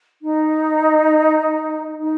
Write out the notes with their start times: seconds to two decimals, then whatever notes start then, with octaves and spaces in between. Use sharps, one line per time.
0.21 D#4
2.00 D#4